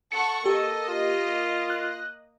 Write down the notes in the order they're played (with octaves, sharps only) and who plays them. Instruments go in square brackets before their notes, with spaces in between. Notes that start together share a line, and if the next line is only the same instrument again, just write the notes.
[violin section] A4 F#5 C#6 [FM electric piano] C#7
[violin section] A#3 D#5 [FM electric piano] G4 [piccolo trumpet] A4
[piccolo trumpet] F4
[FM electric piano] F#6